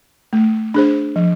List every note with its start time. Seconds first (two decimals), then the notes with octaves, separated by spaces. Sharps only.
0.33 A3
0.74 D4 G#4 C5
1.16 F3